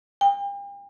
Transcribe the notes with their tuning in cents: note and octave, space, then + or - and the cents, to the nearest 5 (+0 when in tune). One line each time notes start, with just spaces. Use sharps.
G5 +40